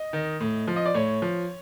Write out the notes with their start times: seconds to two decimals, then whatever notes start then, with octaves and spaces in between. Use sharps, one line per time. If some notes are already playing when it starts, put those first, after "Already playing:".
Already playing: D#5
0.13 D#3
0.40 A2
0.67 F3
0.76 D#5
0.86 D5
0.94 A2 C#5
1.22 F3